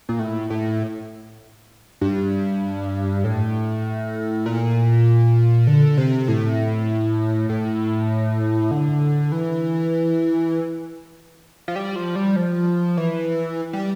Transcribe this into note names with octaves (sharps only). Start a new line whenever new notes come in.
A#2
A2
A2
G2
A2
A#2
D3
C3
A2
A2
D3
E3
F3
G3
F3
G3
F3
E3
G3